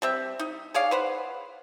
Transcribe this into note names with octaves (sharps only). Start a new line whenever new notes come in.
G3 C4 E5
D#4
G#4 C#5 D5 F5
B4 C5 F#5